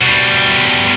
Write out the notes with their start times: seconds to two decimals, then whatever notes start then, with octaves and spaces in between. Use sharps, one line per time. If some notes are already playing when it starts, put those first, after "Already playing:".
0.02 B2 G3